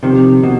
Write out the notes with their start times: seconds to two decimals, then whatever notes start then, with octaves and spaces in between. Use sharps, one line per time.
0.03 C3 D#3 F3 C4 G4 C5
0.43 B2